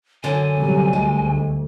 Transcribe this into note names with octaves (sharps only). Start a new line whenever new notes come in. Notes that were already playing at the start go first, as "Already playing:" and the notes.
F#2 D3 G#5
C3 F#3 G3
D2 G#3